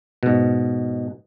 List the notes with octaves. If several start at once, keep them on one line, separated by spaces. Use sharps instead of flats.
G#2 B2